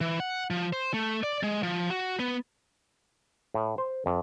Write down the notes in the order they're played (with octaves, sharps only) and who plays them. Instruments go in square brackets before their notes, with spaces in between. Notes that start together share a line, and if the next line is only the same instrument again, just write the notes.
[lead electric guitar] E3
F#5
F3
C5
A3
D5
G#3
F3
F#4
B3
[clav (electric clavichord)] A2
C5
F2